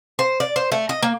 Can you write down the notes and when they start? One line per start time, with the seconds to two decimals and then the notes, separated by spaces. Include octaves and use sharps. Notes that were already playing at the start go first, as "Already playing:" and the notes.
0.19 C5
0.40 D5
0.56 C5
0.72 A3
0.89 D#5
1.03 A#3